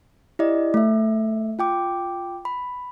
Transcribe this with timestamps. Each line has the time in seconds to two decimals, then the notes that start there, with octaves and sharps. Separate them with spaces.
0.39 E4 G4 D5 D#5
0.74 A3 E5
1.59 F4 G5 D6
2.45 B5